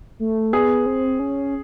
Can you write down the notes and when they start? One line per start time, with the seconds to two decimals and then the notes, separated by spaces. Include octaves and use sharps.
0.19 A3
0.53 B3 G#4
0.86 C4
1.19 C#4